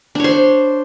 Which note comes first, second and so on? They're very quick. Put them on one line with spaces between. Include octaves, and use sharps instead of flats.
D4 C#5 C5